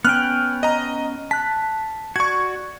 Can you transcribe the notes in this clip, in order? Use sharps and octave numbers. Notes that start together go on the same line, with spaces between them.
B3 C#4 G5 F6 F#6
D#5 A#5
A5 F#6 B6
F#4 D5 C#6 G#6